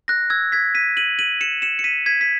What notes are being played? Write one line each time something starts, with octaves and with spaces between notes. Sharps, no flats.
F#6 A#6
E6 G#6
G#6 B6
B6 D#7
D#7 F#7
D#7 F#7
C#7 E7
C#7 E7
C#7
B6 D#7
G#6 B6
B6